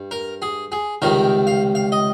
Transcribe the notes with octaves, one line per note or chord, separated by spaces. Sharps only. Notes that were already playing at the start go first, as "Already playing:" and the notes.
Already playing: G2
A#4
G#4
G#4
C#2 C3 D#3 G3 A#4
F5
F5
D#5